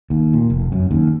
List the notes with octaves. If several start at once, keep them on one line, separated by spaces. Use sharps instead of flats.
D#2
A#2
F1
F#2
D#2